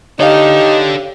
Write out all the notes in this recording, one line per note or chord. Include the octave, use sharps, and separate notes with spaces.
D4 D#4 G4 A4 C#5 F5